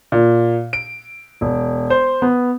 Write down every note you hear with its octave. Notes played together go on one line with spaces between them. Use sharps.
A#2
D7
E1
C5
B3